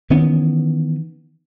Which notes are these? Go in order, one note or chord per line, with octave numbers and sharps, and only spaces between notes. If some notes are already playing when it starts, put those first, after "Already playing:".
D#3 E3 B3 C#4